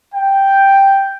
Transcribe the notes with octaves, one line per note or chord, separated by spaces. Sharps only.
G5